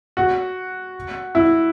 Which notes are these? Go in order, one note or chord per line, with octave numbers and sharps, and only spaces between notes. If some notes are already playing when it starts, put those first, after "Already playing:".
F#4
E4